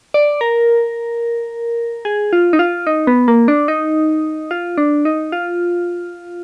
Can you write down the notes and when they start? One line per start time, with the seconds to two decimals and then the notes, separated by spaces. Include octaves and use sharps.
0.14 D5
0.41 A#4
2.05 G#4
2.33 F4
2.53 D#4
2.59 F4
2.87 D#4
3.07 B3
3.28 A#3
3.48 D4
3.68 D#4
4.51 F4
4.78 D4
5.05 D#4
5.32 F4